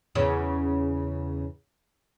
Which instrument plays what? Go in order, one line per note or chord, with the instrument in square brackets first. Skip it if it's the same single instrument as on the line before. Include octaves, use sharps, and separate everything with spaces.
[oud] E2 C#3 C#4